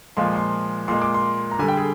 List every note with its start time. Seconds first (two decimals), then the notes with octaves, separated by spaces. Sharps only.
0.17 A#2 F3 G#3 C6
0.36 C6
0.88 A#2 G#3 C6
1.02 D6
1.14 C6
1.51 A#5
1.59 D3 G3 G#5
1.68 G5
1.77 G#4